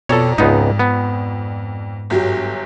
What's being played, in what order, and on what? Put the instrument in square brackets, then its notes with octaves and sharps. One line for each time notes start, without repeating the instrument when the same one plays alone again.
[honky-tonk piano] F2 D5 A#5 [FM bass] B2 [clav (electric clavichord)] A4 C#5
[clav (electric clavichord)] C#2 B3 D#4 [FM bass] G#2
[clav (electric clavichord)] B3
[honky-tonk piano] G1 F#3 G4